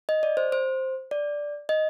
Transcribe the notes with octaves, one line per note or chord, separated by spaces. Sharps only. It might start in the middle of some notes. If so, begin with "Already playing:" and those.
D#5
D5
C5
C5
D5
D#5